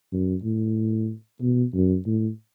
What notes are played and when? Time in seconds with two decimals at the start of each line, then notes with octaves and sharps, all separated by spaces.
0.12 F#2
0.44 A2
1.41 B2
1.74 F#2
2.06 A2